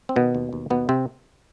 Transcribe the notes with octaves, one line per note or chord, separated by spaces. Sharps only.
C4
B2 D#3 B3
D#2
D#2
D#2 B2 B3
C3 C4